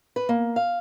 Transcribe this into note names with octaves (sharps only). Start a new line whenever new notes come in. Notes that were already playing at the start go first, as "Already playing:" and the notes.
B4
A#3
F5